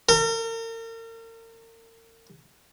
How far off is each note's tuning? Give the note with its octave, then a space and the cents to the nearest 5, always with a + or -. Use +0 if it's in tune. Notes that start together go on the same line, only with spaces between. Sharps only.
A#4 -40